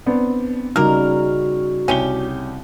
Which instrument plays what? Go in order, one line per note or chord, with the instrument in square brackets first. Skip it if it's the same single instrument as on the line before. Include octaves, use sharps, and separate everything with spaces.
[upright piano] B3 C4 D4
[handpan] C#3 G3 D#4 [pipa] A#3 A#4 [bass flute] F#4 [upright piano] F6
[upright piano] C2 G7 [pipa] C#4 G4